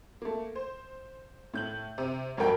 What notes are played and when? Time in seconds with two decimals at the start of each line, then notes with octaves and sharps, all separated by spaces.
0.22 A3 A#3
0.56 C5
1.54 A2 G6 F#7
1.98 C3
2.37 G#1 G2 F#3 A#4 G5